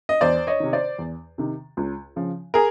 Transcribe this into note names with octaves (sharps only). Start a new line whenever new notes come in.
D#5
E2 C5 D5
C#5 D#5
C3 D#3
C5 D5
E2
C3 D#3
C#2
C#3 F3
G#4 A#4